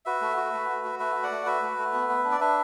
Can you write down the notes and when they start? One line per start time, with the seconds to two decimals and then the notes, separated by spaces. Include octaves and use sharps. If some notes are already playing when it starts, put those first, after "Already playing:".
0.05 F#4 B4 E5
0.21 A3
0.37 F#4
0.53 A3
0.69 F#4
0.84 F#4
0.99 A3 B4 E5
1.15 F#4
1.23 D5 F#5
1.32 A3
1.46 F#4 B4 E5
1.62 A3
1.78 A3
1.93 B3
2.09 B3
2.24 D4
2.32 D5
2.40 D4 B4 E5